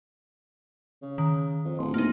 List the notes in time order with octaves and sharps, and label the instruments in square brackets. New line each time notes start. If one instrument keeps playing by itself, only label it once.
[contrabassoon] C#3
[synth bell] D#3
[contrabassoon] F2
[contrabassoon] D1 [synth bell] C6
[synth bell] A#3 D#4